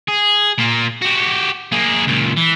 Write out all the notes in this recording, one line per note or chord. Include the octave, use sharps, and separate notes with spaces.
G#4
A#2 A#3
F#4 G4
A#3 G#4
C#2 A#2
E3